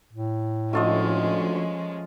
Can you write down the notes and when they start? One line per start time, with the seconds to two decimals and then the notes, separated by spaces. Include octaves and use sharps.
0.13 A2
0.73 D2 F3 G#3 A3 C#4 F4 D#5